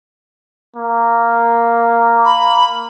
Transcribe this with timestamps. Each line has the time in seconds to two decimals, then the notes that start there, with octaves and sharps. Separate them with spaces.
0.76 A#3
2.24 B5